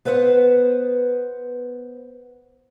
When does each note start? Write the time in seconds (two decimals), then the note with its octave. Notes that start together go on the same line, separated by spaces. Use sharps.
0.05 B3 B4 C5 E5 F#5